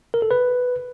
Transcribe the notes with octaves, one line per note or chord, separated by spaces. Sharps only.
A#4
A4
B4